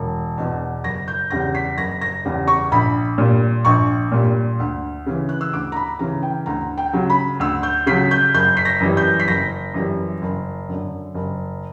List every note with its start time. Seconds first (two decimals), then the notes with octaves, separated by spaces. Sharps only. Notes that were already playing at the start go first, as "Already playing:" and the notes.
Already playing: E1
0.37 E2 B2
0.83 F#1 A#6
1.08 G6
1.30 E2 C#3 G3 A#6
1.55 B6
1.77 F#1 A#6
2.01 A#6
2.25 E2 C#3 G3
2.48 C#6
2.72 A#1 B5
3.18 A#2 G3
3.65 A#1 C#6
4.12 A#2 G3
4.59 D2
5.06 C#3 E3
5.29 F#6
5.41 E6
5.53 D2 D6
5.72 A#5
5.76 B5
5.99 C#3 E3 A#5
6.23 G5
6.46 D2 A#5
6.78 G5
6.93 C#3 F#3
7.10 B5
7.40 D2 E6
7.63 G6
7.87 C#3 B6
7.91 F#3
8.11 G6
8.34 F#1 G6
8.57 B6
8.65 A#6
8.80 F#2 E3 G3
8.97 G6
9.20 B6
9.27 F#1 A#6
9.74 F#2 E3 G3
10.22 F#1
10.68 F#2 D3
11.15 F#1